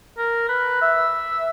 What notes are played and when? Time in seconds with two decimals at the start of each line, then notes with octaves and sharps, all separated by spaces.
0.18 A#4
0.49 B4
0.82 E5